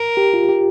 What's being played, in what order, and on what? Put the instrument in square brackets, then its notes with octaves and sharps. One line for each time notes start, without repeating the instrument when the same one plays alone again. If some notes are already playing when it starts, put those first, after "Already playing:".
Already playing: [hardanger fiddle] A#4
[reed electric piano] G4
F4
G4